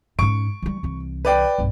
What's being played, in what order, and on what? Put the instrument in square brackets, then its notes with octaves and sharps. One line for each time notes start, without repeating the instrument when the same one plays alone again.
[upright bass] G#2 C#4 [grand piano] C#6 D7
[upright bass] E3 G3
C2 E3
[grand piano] B4 D5 G5
[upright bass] B1 G2